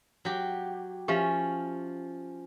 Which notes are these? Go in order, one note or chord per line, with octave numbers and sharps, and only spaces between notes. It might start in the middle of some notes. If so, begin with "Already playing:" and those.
F#3 G4
F3 C#4 G4 E5 F5